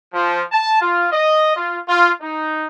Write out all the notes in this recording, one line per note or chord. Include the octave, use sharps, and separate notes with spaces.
F3
A5
F4
D#5
F4
F4
D#4